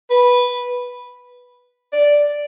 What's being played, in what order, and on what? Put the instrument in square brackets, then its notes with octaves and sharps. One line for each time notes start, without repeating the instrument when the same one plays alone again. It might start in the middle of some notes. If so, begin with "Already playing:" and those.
[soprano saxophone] B4
D5